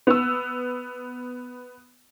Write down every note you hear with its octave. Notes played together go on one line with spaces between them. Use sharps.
B3 E6